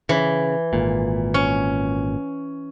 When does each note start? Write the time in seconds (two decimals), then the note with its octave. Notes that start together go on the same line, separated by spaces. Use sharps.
0.09 C#3 E3
0.73 G#1 A#2
1.34 C#4